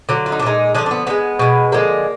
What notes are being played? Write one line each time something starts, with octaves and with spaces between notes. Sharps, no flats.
D3 F#3
F4
D#4
D4
A#2 G#3 D#4
D3 F3 G#3 D4
D4
B3
D3 G#3 B3
B2 G#3
D3 F3 G#3 A#3